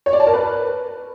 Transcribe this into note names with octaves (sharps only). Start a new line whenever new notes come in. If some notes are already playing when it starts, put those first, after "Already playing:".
C#5
D5
A5
A#4
B4